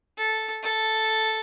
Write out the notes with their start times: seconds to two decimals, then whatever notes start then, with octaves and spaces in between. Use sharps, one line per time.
0.18 A4
0.63 A4